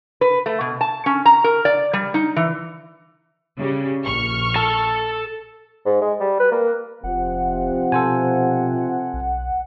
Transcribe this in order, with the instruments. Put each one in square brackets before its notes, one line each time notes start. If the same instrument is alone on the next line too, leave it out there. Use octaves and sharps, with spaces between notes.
[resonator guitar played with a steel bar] B4
A3
B2
A5
C#4
A#5
A#4
D5
G3
D#4
E3
[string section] C#3 G3
A#1 C#6 F6
[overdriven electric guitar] A4 A5
[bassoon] G#2
G#3
G3
B4
A#3
[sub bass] F1 [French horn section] C3 F3 C4 [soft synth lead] F#5
[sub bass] B2 [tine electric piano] A4 C5 G#5
[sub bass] B1